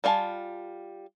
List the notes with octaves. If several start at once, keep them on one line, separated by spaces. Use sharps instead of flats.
G3 D4 F4 G#5 A5